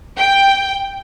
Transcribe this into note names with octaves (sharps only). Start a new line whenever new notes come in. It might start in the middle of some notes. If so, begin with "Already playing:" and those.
G5